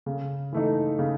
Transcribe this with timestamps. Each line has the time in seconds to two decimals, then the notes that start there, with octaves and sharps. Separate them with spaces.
0.06 C#3
0.53 E3 A3 D#4
0.99 C#3